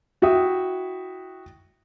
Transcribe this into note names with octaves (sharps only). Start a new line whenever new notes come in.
E4 F#4 E5 G5 D#6